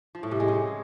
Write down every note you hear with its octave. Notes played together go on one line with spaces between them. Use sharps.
F3
A2
C3
G#3
C#3